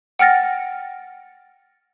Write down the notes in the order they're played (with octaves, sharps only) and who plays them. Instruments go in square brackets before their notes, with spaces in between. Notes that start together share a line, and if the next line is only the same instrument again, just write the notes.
[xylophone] F#5 G5 F6 A6 A#6